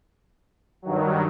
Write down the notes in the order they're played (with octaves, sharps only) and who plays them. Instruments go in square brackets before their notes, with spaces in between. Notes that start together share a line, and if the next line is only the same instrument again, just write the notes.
[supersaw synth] G2 D#3 F#3